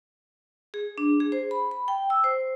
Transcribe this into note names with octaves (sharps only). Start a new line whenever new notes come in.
G#4
D4
G#4
C5
B5
B5
G5
E6
C5